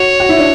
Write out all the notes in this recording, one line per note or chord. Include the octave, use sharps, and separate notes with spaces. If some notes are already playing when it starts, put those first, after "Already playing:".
Already playing: F#4 C#5
F#4
E4
D4